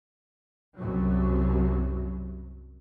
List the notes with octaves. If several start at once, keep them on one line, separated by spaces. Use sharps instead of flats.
C2 F#2 F#3